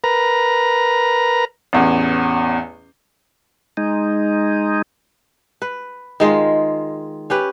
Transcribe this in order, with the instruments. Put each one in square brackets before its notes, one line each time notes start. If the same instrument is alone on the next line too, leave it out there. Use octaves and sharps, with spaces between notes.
[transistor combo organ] A#4 B4 A#5
[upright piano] A1 E2
[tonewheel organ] G#3 D#4
[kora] B4
D#3 G#3 F4
C#4 G4 B4